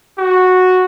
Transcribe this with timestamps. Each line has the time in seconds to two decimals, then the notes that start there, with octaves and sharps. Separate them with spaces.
0.18 F#4